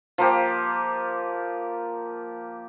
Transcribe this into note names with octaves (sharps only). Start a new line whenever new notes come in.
F3 A#3 G4